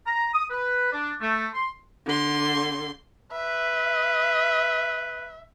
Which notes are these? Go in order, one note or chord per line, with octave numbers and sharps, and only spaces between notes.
A#5
D#6
B4
D4
A3
C6
D3 C6
B4 E5